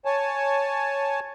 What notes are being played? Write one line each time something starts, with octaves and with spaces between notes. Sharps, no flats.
C#5 G#5 A5